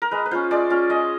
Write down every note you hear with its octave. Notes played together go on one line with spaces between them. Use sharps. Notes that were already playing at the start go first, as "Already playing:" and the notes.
A#4
G#3 B4
B4
C#4 F4 C5
G#3 D5
C#4 F4
G#3 D#5